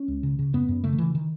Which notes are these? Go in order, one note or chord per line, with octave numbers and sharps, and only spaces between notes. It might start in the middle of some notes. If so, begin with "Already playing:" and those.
Already playing: C#4
C#2
C#3
C#3
F#2 B3
F#2
C#3 A3
D#3
C#3 E3
D#3